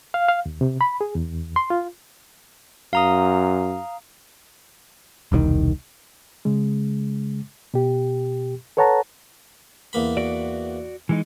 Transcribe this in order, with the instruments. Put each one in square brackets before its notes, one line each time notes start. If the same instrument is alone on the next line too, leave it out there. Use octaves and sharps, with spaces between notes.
[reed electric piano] F5
F5
D#2
C3
B5
G#4
E2
C6
F4
[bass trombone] F#2 [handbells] F5 A#5 D#6
[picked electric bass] E1 C2 A#2 D#3
[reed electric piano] C#3 G#3
B2 G4
A4 B4 C#5 F#5 A5 A#5
[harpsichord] E2 A#3 B5
[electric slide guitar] F#4 D5
E3 G#3 D#4